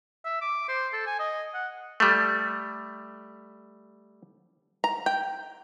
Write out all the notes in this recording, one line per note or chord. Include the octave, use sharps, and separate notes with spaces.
E5
D6
C5
A4
G#5
D#5
F#5
G3 A3
A#5
G5